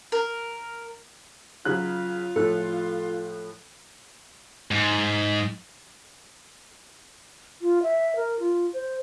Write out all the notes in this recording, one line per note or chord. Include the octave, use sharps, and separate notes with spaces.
A#4
C#3 F#3 F4 F#6
A2 F3 E4 A4 F#6
G#2
F4
E5
A#4
F4
C5